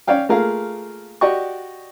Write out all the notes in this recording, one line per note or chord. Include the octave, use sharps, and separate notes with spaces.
C#4 C#5 D5 F5 G5
A3 A#3 F4 G#4 A#4 F5
F#4 G4 D5 D#5 G5 C#6